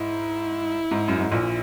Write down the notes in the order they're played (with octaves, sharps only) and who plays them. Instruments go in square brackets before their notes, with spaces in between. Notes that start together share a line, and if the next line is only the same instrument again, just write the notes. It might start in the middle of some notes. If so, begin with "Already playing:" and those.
Already playing: [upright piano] G#2 [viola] E4
[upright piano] G#2
F#2
G#2
A#1 A#2